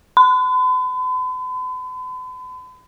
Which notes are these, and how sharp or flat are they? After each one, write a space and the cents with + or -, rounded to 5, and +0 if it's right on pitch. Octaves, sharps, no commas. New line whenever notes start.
B5 +45